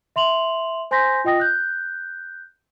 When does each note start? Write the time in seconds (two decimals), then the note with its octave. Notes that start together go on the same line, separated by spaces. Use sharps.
0.16 E5 C6 F7 F#7
0.91 C5 G#5 C6 G6 A#6 B6
1.25 F4 D#5 G5 D#6 A#6
1.40 F#6 G6